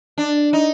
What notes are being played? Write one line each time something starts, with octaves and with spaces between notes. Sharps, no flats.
D4
D#4